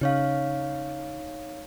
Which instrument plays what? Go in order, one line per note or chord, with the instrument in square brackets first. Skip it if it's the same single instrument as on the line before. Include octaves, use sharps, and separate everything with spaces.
[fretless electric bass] C#3 [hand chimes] D#4 C#5 F5